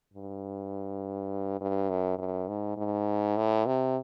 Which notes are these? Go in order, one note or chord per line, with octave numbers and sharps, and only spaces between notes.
G2
G2
F#2
F#2
G#2
G#2
A2
C3